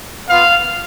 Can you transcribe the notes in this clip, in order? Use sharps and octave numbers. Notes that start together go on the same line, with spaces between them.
B3 F4 F5